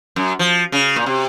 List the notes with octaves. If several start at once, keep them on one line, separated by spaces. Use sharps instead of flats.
F#2
F3
C#3
A#2
C3